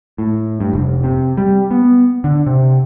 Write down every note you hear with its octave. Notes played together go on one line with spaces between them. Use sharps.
A2
G2
F1
C3
G3
B3
D3
C3